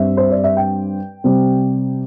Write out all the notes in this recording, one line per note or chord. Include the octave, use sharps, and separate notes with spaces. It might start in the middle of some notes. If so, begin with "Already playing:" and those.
Already playing: G2 G3 C4 E5
C5
D5
E5
G5
C3 G3 C4